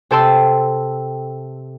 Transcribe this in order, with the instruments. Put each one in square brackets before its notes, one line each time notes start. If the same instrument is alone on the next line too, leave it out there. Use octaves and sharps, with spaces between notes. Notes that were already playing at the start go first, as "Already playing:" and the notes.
[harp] C3 A4 G5 A5 C6 E6